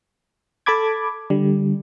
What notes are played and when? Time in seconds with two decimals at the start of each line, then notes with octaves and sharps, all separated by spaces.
0.66 A4 A5 B5 D6 G#6
1.30 D3 G3